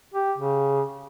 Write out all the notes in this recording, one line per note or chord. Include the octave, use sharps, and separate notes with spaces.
G4
C#3